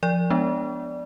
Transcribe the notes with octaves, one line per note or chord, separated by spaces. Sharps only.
F3 D5
G#3 B3 D4